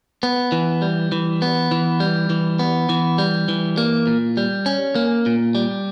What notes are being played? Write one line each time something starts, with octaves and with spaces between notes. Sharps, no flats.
B3
E3
G3
E3
B3
E3
G3
E3
B3
E3
G3
E3
A#3
A#2
G3
C#4
A#3
A#2
G3